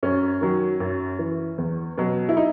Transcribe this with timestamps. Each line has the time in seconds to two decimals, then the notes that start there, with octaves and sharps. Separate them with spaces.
0.03 F#2 C#4
0.41 D#3 F#3
0.80 F#2
1.19 E3
1.58 E2
1.98 B2 F#3
2.29 E4
2.37 D#4